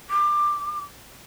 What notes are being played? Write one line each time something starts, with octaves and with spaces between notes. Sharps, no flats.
D6